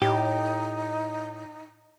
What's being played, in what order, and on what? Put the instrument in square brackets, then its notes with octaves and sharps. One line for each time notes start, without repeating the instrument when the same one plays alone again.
[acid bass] A2 [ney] D#4 [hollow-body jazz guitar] G4